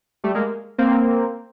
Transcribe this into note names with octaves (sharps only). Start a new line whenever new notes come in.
G3 A3
G#3 A#3
A#3 C4